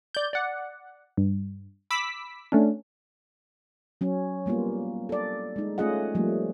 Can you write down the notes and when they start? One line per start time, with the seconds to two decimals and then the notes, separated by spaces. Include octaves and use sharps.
0.15 D5 G6
0.33 D5 F#5
1.17 G2
1.91 B5 D6 E6 B6
2.52 A3 C#4 D4
4.01 F#3 C#4
4.46 G3 A#3 B3 F4
5.09 A4 D5
5.56 G#3 D#4
5.78 A3 C#4 F4 G#4 D#5 F#5
6.15 F3 G3 A3 A#3